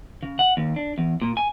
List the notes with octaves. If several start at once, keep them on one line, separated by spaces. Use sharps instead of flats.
C#3
F#5
D#2
D4
E2
A#2
G#5